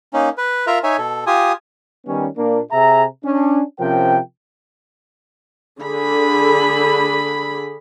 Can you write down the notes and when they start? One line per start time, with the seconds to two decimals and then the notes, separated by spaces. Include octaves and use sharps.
0.13 A#3 C#4 D#4
0.38 B4
0.67 F4 A#4 E5 A#5
0.83 D#4 C#5 E5 G#5
0.98 B2 A4
1.27 F4 G4 G#5 D#6
2.07 D#3 G3 B3 C#4
2.38 A#2 A#3 D4
2.72 C3 G#4 E5 A#5
3.25 C#4 D4
3.80 C3 F3 C#4 A#4 G5
5.80 D3 G#4 B5